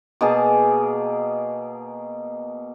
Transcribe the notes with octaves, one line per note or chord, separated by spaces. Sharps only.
B2 A#3 G#4 A5